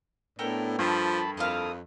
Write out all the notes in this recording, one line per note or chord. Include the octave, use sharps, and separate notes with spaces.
A2 A3 B3 D4 A#4 G5
G2 F3 A5 B5
F2 E4 A4 A#4 F5 D#6